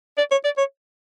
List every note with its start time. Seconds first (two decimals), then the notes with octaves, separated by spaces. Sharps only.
0.18 D5
0.31 C#5
0.44 D5
0.58 C#5